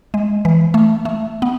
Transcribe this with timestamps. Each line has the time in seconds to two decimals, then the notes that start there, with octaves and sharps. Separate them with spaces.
0.14 G#3
0.45 E3
0.74 A3
1.05 A3
1.42 B3